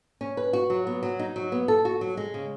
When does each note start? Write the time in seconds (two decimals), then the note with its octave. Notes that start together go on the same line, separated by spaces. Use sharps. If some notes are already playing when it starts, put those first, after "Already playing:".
0.21 C#4
0.37 B4
0.53 F#4
0.70 F#3
0.87 B3
1.03 F#3
1.19 D#4
1.36 F#3
1.52 B3
1.68 A4
1.85 F#4
2.01 F#3
2.17 G#3
2.34 C#3